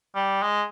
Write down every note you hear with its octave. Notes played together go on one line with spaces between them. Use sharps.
G3
G#3